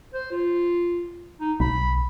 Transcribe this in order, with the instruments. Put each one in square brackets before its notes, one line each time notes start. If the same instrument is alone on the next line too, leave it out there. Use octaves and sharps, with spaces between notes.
[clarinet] C5
F4
D#4
[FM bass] B1 [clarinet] B5